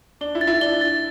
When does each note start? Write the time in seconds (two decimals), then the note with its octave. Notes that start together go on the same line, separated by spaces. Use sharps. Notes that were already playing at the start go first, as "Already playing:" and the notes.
0.21 D4 G7
0.35 E4
0.41 A6
0.47 E4
0.61 D4 G7
0.81 A6